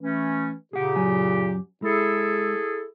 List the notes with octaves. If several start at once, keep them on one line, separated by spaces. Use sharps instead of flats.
E3 A3 C#4
A#2 C#3 G4 G#4 F#5
F#2 F#3 G#5
G#3 E4 G#4 A4